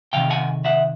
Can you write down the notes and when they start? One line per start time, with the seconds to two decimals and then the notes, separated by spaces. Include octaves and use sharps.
0.13 D2 C3 D#3 F5 G5
0.30 F#5 G#5
0.65 E5 F#5